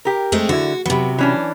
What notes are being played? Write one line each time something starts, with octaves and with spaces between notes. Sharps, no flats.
G4 A#4
G#3 A3 C4
D3 E4 F#4
C3 F#3 B3
E3 C#4 D4